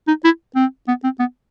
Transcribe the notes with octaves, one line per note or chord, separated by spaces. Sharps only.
D#4
E4
C4
B3
C4
B3